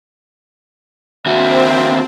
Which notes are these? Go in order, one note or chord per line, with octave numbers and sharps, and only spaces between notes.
D#2 C4 F#4 E5